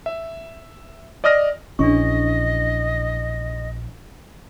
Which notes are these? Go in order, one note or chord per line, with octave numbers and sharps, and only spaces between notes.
E5
D5 D#5 D#6 F6 A#6
A#1 E3 C#4 D4 G#4 D#5 C#6